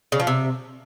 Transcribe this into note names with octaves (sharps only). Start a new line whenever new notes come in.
C#3
F3
C3